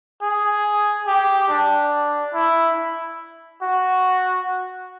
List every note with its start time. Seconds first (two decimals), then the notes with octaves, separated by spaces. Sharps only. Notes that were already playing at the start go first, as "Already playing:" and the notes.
0.22 G#4
1.07 G4
1.49 D4
2.34 E4
3.62 F#4